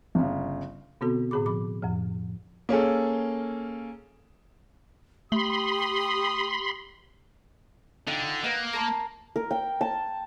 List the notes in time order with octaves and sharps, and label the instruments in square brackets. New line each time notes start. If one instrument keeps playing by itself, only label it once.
[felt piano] G1 C#3
[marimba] B2 D3 B3 C4 F#4 A4
A2 D3 G#4 B5 D6
F3 B5 D6
F2 A2 F3
[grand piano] A#3 C#4 G#4 A4
[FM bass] A3 [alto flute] G4 [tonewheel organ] B5 C6 [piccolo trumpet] D#6
[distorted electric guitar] D3 [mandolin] D#4 F4 G5
[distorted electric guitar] A#3 [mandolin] B4 D#5 F#5
[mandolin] A#4 A5 C6
[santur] A#4
G5
A5